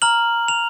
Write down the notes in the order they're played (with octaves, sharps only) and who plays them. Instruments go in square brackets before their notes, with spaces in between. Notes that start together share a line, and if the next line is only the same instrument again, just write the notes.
[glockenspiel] A#5 F6 F#7
F7